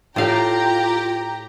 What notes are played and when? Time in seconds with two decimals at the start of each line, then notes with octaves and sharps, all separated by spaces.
0.16 A2 F4 G4 F5 A#5